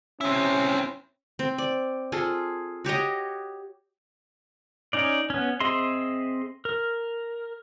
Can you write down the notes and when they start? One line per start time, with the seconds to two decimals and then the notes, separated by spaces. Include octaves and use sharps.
0.21 C4 C#4 E4
1.39 C4
1.58 D5
2.12 F4 G#4 A4
2.85 F#4 G4 C#5 D#5
4.93 C#4 D#4 D5
5.30 B3 C#4
5.60 C4 G#4 D#5 E5 C6
6.65 A#4